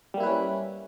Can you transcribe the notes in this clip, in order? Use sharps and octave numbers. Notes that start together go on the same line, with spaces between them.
G3 A#3 C#4 E4 B4